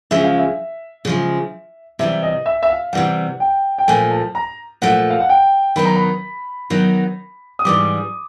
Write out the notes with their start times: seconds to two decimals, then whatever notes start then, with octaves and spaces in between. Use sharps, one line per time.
0.11 C#3 F3 G#3 E5
0.24 F5
0.38 E5
1.05 C#3 F3 G#3
1.99 C3 E3 G3 E5
2.23 D#5
2.46 E5
2.63 E5
2.70 F5
2.93 C3 E3 G3 F#5
3.40 G5
3.78 G5
3.88 A#2 F3 A3 G#5
4.11 A5
4.35 A#5
4.82 A#2 F3 A3 F#5
5.10 F5
5.20 F#5
5.29 G5
5.76 D#3 F#3 B3 D#4 B5
5.85 A#5
5.95 B5
6.70 D#3 F#3 B3 D#4
7.59 D#6
7.65 G#2 E3 G3 D6